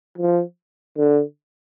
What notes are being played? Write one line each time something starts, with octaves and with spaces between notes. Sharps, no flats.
F3
D3